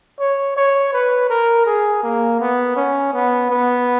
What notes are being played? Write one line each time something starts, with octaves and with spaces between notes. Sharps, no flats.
C#5
C#5
B4
A#4
G#4
A#3
B3
C#4
B3
B3